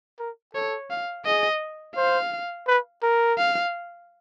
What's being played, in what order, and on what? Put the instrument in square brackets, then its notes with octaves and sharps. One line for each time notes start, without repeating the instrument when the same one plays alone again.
[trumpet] A#4
[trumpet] A4 [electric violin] C#5
[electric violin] F5
[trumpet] G#4 [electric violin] D#5
[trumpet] C5 [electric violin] F5
[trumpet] B4
A#4
[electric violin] F5